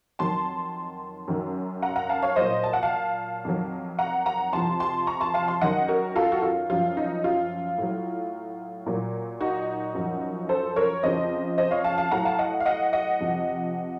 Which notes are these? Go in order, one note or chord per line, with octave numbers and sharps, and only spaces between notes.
F2 D#3 F#3 A5 C6
F#2 D#3 F#3
F#5 A#5
F#5 A#5
F5 A5
C#5 F5
A#2 F#3 C5 D#5
A5
F#5
F5 A5
F2 D#3 F#3
F#5 A#5
F#5 A#5
F2 C3 F3 A5 C6
A5 C6
A#5 C#6
A5 C6
F5 A5
A5 C6
F#2 D#3 F#3 D#5 F#5
F#4 A#4
F4 A4
F#4
F4
F#2 F3 F4
D#4
F4
A2 F#3
A#2 F#3
D#4 F#4
F#2 F3
A4 C5
A#4 C#5
F2 C#3 F3 C5 D#5
C5 D#5
C#5 F5
F5 A5
F5 A5
A2 F#3 F#5 A#5
F5 A5
D#5 F#5
F5
D#5 F#5
D#5 F#5
F2 C3 F3